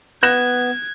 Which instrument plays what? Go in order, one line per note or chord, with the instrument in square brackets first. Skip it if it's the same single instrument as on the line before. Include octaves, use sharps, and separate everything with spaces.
[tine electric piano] B3 [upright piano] F#6 A#6 E7 [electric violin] G#6